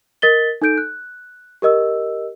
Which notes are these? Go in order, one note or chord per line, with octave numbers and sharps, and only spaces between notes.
A#4 D#5 A6 B6 G7
D#4 A4 G6 D7
F#6
G4 A#4 D#5 E6